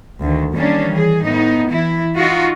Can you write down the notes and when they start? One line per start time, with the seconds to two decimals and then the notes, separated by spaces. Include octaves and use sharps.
0.21 D2 D#3
0.55 D#3 E3 G3 A#3 C#4 D4
0.91 E3 G#4
1.23 A2 B3 D#4
1.68 E3 E4
2.17 D#4 F4 F#4